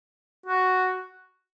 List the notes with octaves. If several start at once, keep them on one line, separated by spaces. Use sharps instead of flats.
F#4